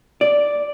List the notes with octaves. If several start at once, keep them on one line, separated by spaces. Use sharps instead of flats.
D5